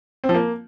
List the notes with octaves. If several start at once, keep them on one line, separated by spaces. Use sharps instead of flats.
C4
F3
A#3